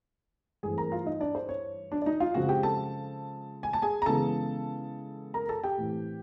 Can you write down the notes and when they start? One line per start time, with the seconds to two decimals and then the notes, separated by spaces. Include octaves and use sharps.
0.63 G2 E3 A3 C4 G#4 G#5
0.78 A#4 A#5
0.92 F4 F5
1.06 D#4 D#5
1.20 D4 D5
1.35 C5
1.49 C#5
1.92 D4 D5
2.02 D5
2.06 D#4 D#5
2.20 F4 F5
2.34 C#3 F3 G#3 C4 F#4 F#5
2.49 G4 G5
2.63 A4 A5
3.63 G#5
3.73 A5
3.82 G#4 G#5
4.02 A#5
4.06 C#3 E3 G#3 B3 A4 A5
5.34 A#4 A#5
5.49 A4 A5
5.64 G4 G5
5.78 A2 E3 A3 C4